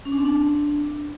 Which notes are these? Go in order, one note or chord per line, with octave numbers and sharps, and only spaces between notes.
C#4
D4
C4
D4